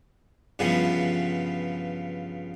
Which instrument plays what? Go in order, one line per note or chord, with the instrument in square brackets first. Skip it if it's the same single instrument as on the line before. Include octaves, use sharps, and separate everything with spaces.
[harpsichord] G2 C#3 E3 F3 B3